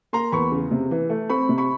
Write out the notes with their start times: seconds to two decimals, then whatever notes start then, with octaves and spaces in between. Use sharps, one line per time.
0.13 A#3 A#5 C6
0.32 E2 B5 C#6
0.52 C#3
0.71 C3
0.91 E3
1.09 A3
1.30 C4 B5 C#6
1.49 C3
1.58 B5 C#6